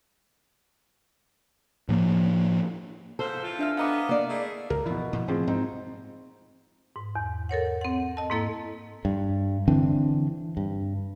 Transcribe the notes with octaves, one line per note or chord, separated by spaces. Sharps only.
A2 F3 A#3
G#2 F3 A4 C5
E3 C4 F4
D4 E5 F6
B3 D#5 F5 A#5 D6
A#3 D5
A3 E4 G#4
C#2 A#4
B2 E3 F3 E4
A#2 F3
A2 F3 C4 G#4
G#2 C4 D#4
G#2
E2
A4 A#4 C#5 F#5
C4 F#5
D#5 A5
G#2 A#3 E4 A4
G2
D3 E3 C4 D4
G2